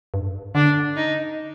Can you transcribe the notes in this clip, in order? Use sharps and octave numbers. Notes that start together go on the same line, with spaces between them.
G2
D3 D4
D#4